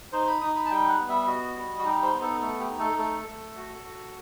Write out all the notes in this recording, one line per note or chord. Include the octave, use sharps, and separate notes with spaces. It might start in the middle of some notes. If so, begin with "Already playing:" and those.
D#4 C5
B5
D#4 D#6
B5
A5
G3 G5
F#5
B3
E5
F#4 D#5
G3
F#4
D#4 G4
C5
B3
A4
A3 A4
G4
D#4
A4
A3 A4
A3
F#4
F#4